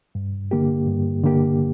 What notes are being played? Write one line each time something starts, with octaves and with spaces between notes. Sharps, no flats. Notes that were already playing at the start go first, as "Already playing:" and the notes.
G2
D3 A#3 G4
G2
D3 A#3 G4